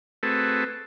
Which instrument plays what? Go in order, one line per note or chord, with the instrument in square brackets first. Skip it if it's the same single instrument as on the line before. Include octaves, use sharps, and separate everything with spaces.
[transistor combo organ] A3 C4 F#4 G#4 A4 B4